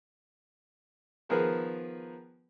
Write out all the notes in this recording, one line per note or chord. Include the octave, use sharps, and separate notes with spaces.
D#3 F3 B3 G#4 A#4 B4